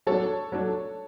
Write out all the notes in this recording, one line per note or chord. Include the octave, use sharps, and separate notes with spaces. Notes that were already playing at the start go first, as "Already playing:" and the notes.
F#3 A3 D4 A4 C#5
F#3 A3 D4